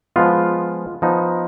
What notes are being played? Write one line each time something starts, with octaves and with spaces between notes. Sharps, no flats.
F3 G#3 B3 F4
F3 B3 D#4